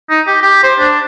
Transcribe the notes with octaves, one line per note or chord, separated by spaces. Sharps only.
D#4
G4
G4
C5
D4